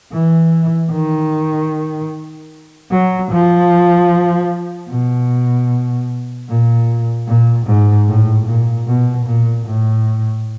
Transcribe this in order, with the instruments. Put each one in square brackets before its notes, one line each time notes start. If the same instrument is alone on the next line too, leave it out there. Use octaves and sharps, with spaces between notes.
[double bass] E3
D#3
F#3
F3
B2
A#2
A#2
G#2
A2
A#2
B2
A#2
A2